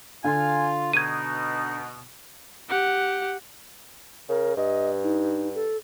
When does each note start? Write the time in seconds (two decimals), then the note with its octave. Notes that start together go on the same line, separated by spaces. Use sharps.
0.24 D3 F4 G#5
0.93 B2 D#4 G#6 D#7
2.69 G4 F#5
4.29 C#3 A#4
4.57 G2 D#5
5.04 D#4
5.55 A4